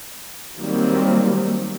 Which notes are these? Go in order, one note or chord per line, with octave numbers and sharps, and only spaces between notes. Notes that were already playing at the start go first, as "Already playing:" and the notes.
D#3 F#3 G3 A#3 C4